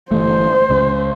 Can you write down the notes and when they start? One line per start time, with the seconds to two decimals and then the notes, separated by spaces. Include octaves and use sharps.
0.12 G1 E3 A3 C5
0.70 C#2 C#3